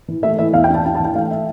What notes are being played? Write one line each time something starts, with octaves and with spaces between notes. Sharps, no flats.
E3
A3 E5
E3 E5
E2 F5
G5
D4
A5
D4 A5
A5
E3 G5
A3 F5
E5